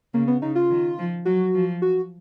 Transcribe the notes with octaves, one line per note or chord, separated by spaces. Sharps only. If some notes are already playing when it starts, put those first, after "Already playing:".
C#3 A#3
B3
C#3 D#4
F4
D#3
F3
F#3 F#4
F3
F#4